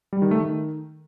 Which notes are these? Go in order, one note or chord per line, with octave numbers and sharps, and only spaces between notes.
G3
D#3
A3
D#3